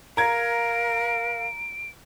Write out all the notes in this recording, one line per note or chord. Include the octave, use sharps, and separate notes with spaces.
A#4 F5 A#5 G#6 D7